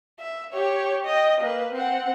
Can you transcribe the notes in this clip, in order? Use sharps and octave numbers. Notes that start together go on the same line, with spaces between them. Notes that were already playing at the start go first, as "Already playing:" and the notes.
E5
G4 C#5
D#5 G5
A#3 B4
C4 F#5